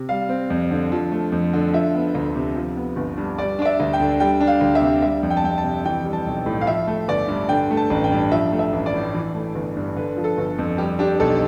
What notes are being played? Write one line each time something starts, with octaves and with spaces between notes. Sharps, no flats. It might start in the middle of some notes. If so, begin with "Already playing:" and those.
Already playing: C3
G3 F5
C4
F2
D3
F3
A3
F2
D3
F3 E5
B3
D2
C3
F3
B3
G1
G2
G3 D5
D4 D5
E5
D2
G5
D3
G3 G5
D4
F5
D2
E5
C3
G3 E5
F2
G5
A5
F2 G5
A5
C3
E3 G5
G3
A5
B1
A2
F5
F3 E5
A3
G1 D5
G2
D3 G5
A3
A5
A1
G5
G2
F3 E5
A3
E5
A1
D5
A2
E3
A3
G1
G2
D3 B4
F3
A4
G1
F2
G3 G4
D4 G4
B1 A4